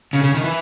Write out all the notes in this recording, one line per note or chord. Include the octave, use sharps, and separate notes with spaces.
C#3
C#3
D#3
E3